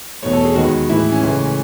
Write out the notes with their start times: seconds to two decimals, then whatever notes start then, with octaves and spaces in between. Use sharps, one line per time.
0.22 E2 B2 A3 C#5
0.33 A4
0.45 G#4
0.56 D#2 D#3 G#3 B3 F#4
0.90 A2 E3 G#3 E4
1.12 C#4
1.23 C#2 C#3 E3 A3